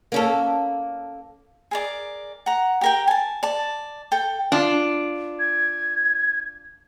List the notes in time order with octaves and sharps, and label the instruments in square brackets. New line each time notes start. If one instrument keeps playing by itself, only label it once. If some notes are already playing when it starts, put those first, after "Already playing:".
[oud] A#3 C#4 A4
[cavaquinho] G#4 A#4 D5
F#5 A#5
G4 A#4 G5
G#5 A5
D5 A5
A4 G5
[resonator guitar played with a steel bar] D4 F4
[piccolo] G#6